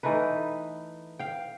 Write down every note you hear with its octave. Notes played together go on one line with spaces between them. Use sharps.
E3 A3 D#4 B4
F5 G5